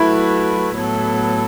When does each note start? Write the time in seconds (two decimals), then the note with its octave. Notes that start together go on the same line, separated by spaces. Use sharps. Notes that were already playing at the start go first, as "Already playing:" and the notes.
Already playing: F#3 A3 E4 F#4 B4
0.75 A2 F#3 B3 A4